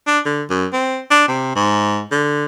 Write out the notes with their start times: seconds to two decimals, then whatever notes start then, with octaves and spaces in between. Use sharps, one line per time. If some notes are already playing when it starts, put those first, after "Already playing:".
0.07 D4
0.25 D3
0.50 F#2
0.73 C4
1.11 D4
1.28 C3
1.55 G#2
2.11 D3